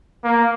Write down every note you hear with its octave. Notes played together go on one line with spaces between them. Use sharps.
A#3